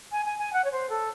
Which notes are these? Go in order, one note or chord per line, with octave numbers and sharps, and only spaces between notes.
G#5
G#5
G#5
F#5
C#5
C5
A4